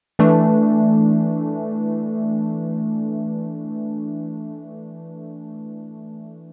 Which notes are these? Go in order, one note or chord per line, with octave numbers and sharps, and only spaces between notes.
E3 A3 D4